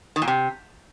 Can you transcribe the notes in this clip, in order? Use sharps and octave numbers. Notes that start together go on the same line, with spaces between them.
D#3
A#2
C3